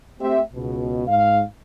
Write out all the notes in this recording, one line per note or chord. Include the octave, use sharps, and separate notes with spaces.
A3 C4 G4 E5
C#2 B2
G#2 F5